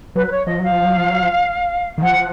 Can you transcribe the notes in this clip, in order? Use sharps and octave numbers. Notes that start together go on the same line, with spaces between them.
F#3 B4
B4
C#5
F3 D#5
F#3 F5
F3
F#3
F3
F#3
F3
D#3
F3 F#5